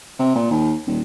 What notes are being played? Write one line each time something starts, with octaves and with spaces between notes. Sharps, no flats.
C3
A#2
D#2
D#1